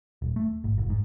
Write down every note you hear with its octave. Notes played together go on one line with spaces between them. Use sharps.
D#1
A3
G#1
F1
G#2